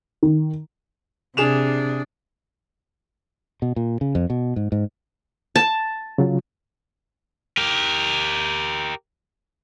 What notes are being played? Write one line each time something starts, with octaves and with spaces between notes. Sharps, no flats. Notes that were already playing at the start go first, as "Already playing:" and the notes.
D#3
C3 D4 G#4 E7 F7
B2
A#2
C#3
F2
B2
G#2
G#2
A5
C#3 F#3 F4
G4 A#4